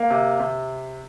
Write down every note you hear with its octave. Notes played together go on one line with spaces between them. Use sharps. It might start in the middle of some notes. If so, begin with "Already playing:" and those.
Already playing: A#3
C3
C3